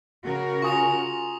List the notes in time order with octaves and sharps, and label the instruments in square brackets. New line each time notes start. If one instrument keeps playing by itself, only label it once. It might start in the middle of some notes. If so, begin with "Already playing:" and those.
[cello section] C#3 F#4 A#4
[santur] F4 G#5 A#5 [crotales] C#6 D#6 F7